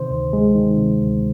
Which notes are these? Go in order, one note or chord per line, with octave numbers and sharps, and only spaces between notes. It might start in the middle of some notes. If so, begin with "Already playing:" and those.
Already playing: C3 D#3 C5
D2
G#3
D#3
C3
D2